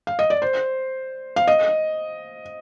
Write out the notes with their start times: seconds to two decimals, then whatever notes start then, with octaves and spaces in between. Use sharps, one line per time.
0.07 F5
0.19 D#5
0.30 D5
0.42 C5
1.36 F5
1.47 D#5